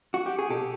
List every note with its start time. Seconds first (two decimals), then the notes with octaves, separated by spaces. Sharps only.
0.14 F#4
0.26 G4
0.39 G#4
0.50 B2 G4 A4